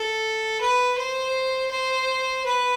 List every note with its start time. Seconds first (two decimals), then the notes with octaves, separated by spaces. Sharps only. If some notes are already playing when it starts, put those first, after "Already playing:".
Already playing: A4
0.61 B4
0.98 C5
1.71 C5
2.46 B4